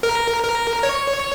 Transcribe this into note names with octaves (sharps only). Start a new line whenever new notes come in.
A#4
A#4
C#5